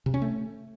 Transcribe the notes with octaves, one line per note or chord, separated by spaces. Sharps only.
C3
C#4
A3